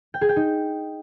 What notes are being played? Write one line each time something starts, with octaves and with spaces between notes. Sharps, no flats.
G5
G#4
G5
D#4